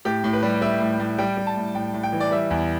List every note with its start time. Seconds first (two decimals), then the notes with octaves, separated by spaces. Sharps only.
0.05 A2 G4
0.24 A2
0.33 B4
0.43 G3
0.62 G3 E5
0.80 A2
1.00 A2
1.18 G3 G5
1.37 G3
1.47 A5
1.56 A2
1.75 A2 G5
1.94 A2
2.03 G5
2.12 E3
2.20 D5
2.31 G3 E5
2.50 E2